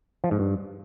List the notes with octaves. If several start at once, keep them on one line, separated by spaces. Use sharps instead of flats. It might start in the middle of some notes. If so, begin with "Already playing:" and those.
F3
G#2
G2